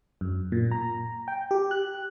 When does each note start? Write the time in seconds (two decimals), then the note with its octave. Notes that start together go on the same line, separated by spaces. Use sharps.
0.21 F#2
0.52 A#2
0.71 A#5
1.28 G5
1.51 G4
1.71 F#6